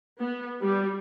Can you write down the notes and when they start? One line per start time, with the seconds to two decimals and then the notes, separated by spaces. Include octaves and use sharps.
0.18 B3
0.62 G3